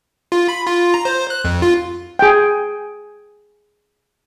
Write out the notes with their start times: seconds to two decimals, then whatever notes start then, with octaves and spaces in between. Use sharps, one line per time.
0.32 F4
0.48 B5
0.67 F4
0.94 A#5
1.05 C5
1.30 F#6
1.45 F2
1.62 F4
2.19 G#4 G5